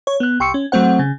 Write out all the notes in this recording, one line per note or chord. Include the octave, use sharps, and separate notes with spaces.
C#5
B3 F#6
C2 G5 C6 C#6 E6 C#7
C#4
F#3 A3 C4 C5 F#5
C#3